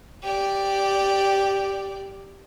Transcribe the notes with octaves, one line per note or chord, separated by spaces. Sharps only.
G4 D5